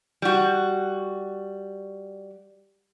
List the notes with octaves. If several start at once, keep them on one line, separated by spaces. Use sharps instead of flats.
G3 F#4